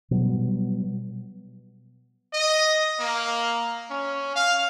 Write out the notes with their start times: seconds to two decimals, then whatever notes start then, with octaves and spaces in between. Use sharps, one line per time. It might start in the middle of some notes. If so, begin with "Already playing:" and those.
0.11 B2 F#3 G3
2.33 D#5
2.99 A#3
3.90 C#4
4.35 F5